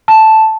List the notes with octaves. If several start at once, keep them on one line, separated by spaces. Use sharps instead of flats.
A5